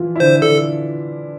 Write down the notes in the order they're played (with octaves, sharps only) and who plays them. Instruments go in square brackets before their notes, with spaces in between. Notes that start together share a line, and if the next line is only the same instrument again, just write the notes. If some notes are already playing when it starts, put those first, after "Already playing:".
Already playing: [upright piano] E3 F3 E4 F4
E4
[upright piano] D3 D4 [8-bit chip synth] C5
[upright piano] D3 D4 [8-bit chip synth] A4